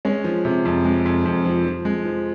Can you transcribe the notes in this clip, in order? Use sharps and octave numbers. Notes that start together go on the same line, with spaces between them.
G#3 C#4
F3
C3
F2
G#3
F2
F2
F3
F3
G#3
F3